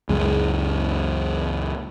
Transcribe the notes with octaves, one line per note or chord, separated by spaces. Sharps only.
C#2 F#2 G#3